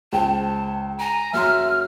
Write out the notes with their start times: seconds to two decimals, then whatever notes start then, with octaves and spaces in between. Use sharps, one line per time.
0.12 C#2 C5 G5 A5
1.00 G#5 A#5
1.33 F#1 F#3 E5 C6 F6